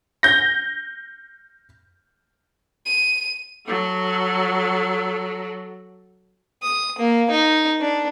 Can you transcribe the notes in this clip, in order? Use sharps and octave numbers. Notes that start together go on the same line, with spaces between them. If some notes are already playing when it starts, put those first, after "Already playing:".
G6 A#6
D#7
F#3 A4
D#6
A#3
D#4
D4